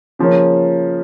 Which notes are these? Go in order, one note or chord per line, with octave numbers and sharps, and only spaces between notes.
C#3 F3 A#3 C#4